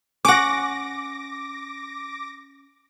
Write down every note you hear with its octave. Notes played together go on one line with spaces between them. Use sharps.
C#4 F#5 D6 A#6